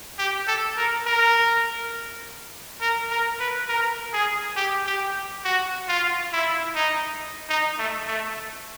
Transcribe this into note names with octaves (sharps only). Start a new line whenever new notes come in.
G4
A4
A#4
A#4
A#4
A#4
B4
A#4
G#4
G4
G4
F#4
F4
E4
D#4
D#4
A3
A3